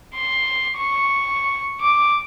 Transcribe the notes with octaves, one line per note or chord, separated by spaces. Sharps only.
C6
C#6
D6